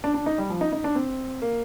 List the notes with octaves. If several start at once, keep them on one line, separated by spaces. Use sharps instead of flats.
D4
D4
D#4
G3
F3
D#4
D#4
D4
C4
A#3